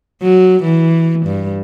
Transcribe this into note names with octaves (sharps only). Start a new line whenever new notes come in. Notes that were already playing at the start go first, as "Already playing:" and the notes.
F#3
E3
G2